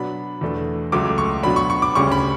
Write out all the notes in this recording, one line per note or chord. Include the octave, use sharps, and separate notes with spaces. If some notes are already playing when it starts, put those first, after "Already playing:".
Already playing: B2 F#3 B3 D4 B5
E2 B2 A3 D4
C#2 C#3 F#3 A3 D6
C#6
B2 F#3 B3 D4 B5
C#6
C#6
D6
D2 C#3 G3 C#4 C#6
B5